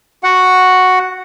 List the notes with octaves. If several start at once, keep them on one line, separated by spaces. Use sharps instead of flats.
F#4 F#5